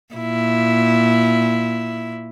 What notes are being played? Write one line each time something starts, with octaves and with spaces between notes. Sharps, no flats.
A#2 E4